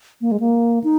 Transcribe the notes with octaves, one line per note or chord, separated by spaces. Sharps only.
A#3
G#3
A#3
D#4